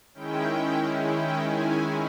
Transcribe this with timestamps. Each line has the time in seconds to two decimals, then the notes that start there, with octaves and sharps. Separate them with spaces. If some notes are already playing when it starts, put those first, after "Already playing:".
0.14 D#3 G#3 C#4 E4 G5
1.04 G5
1.48 G#5